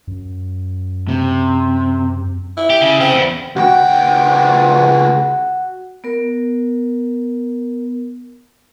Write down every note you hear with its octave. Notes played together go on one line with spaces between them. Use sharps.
F#2
C3
E4
G4
C#3
C#3 C4
E2
C#2 F#4 G5
B3 A#4